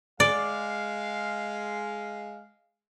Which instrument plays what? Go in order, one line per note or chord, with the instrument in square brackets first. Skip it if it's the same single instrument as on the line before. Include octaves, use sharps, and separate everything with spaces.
[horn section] G#3 F5 [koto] D5